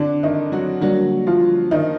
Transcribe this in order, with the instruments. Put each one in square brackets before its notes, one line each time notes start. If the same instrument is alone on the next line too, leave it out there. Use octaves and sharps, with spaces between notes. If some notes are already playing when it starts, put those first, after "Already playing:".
Already playing: [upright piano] D3 D4 [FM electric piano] C4
[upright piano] D#3 D#4
F#3 F#4
[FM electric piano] D3 G3 A#3 D4 [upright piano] F#3 F#4
[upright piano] F3 F4
D#3 D#4